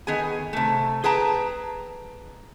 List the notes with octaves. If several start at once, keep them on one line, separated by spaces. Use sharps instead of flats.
D#3 B3 G#4 G#5
C3 A3
G#4 B4 G5 A5 A#5